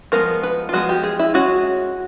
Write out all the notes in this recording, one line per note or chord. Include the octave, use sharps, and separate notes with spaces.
F3 G#3 B3 A#4
B4
F4
F3 G#3 B3 F#4
G4
G#4
E4
G#3 C#4 F#4